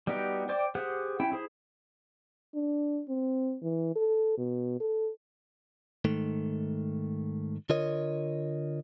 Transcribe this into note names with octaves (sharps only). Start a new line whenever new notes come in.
G3 B3 D#4 F#4 G4
C5 D5 G5 D6
G4 G#4 C5 F#5 F#6
C#4 E4 G5
E4 G#4 C5
D4
C4
E3
A4
B2
A4
G#2 D#3 A3
D3 F4 A#4 C#5 D#5